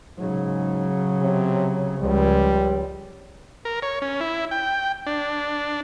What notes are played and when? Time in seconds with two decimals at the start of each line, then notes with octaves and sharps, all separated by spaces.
0.18 G#2 C#3 F#3
1.22 C3
2.01 C#2 F3 G3
3.65 A#4
3.82 C#5
4.02 C#4
4.21 E4
4.51 G5
5.06 D4